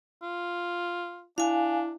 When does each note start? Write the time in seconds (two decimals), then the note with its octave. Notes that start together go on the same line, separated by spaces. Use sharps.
0.23 F4
1.38 D4 E4 F5 G#5